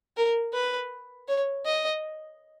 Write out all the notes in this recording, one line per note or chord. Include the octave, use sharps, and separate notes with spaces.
A#4
B4
C#5
D#5